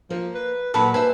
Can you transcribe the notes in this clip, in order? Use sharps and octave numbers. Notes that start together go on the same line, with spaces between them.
F3 A#3
B4
A#2 F#3 A#3 A4 B4 F#5
B4 C5 E5 G#5